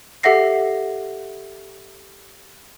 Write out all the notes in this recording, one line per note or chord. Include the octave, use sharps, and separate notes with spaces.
G4 A4 E5 F#5 A#6 C7